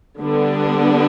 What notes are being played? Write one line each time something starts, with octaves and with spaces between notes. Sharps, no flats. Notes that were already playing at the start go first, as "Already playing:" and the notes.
D3 G3 B3 D4